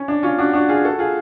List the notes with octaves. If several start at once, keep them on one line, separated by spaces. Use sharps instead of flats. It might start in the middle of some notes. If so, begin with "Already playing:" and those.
Already playing: C#4
D4
C#4 F4
D4 F#4
D4 F#4
F4 G#4
F#4 A4
F4 G#4